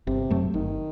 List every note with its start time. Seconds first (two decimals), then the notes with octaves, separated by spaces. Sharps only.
0.07 G1 C3
0.31 F#2 F#3 A3
0.54 G1 D#3